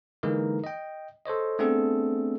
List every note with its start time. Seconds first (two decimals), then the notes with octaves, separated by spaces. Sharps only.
0.23 D3 E3 G#3 A#3 D#4 A#4
0.64 D#5 G5
1.25 A4 C5 C#5 D#5
1.59 A3 B3 C4 D4 G#4 A4